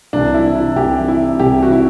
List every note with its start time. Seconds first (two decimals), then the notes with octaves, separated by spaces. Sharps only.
0.13 C2 C3 E3 D4
0.34 E4
0.55 E4
0.76 C2 C3 E3 G4
1.08 E4
1.40 C2 C3 E3 G4
1.63 F#4
1.72 E4